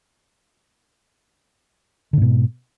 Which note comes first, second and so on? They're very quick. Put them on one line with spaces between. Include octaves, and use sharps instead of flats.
D3 G#2 B2